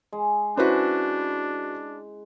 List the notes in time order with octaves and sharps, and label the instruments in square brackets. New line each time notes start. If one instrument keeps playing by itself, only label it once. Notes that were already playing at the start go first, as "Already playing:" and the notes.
[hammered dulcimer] G#3
[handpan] C#4 E4 [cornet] D4 [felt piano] F#4 B4 C5